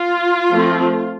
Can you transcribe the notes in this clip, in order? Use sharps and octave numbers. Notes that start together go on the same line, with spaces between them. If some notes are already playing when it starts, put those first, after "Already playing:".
Already playing: F4
F3 A3 C4